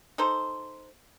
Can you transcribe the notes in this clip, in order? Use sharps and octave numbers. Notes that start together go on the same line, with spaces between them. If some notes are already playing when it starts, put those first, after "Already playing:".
D#4 A4 C5